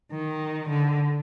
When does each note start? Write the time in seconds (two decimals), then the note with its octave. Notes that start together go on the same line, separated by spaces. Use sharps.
0.12 D#3
0.70 D3